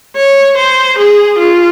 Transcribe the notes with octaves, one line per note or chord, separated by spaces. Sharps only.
C#5
C5
G#4
F4